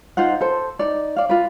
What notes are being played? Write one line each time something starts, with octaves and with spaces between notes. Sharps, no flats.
D#4 F4 C5 F#5
A4 C5
D#4 D5
D5 F5
F4 B4